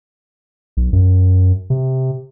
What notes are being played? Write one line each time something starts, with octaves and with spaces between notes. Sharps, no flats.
B1
F#2
C3